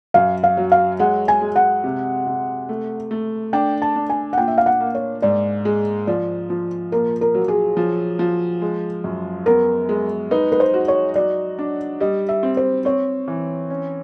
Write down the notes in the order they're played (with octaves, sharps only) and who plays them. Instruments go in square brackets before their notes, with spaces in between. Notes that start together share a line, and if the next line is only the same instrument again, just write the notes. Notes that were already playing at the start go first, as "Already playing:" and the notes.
[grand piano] F#2 [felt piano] F5
[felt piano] F5
[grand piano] F#3
[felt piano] F5
[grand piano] G#3 [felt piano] F#5
[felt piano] G#5
[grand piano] G#3
[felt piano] F#5
[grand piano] C3
C3
A3
A3
[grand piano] D4 [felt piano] G5
[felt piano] A5
[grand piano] D4
[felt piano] G#5
F#5
[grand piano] A#2 [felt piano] G5
[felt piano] E5
F5
F#5
[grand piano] A#3
[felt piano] C#5
[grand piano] G#2 [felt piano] D5
[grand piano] G#3
[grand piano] F3 [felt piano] D5
[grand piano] F3
[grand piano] A#2 [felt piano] A#4
[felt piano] A#4
[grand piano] F#3
[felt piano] G#4
[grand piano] F3
F3
G#3
F#2
[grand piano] B3 [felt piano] A#4
[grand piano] G#3
[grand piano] D#4 [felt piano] B4
[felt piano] B4
C5
[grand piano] F#4
[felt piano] C#5
[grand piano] F#3 [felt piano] D5
[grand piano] D4
[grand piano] G3 [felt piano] D#5
[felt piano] E5
[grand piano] C4
[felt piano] C5
[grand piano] C4 [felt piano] C#5
[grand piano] E3
C#4